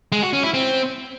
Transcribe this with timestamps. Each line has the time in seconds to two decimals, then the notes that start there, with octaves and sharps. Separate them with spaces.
0.12 G#3
0.23 F#4
0.33 C#4
0.43 E4
0.54 C4